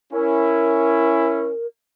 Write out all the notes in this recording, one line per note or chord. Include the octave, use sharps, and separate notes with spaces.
C#4 E4 A#4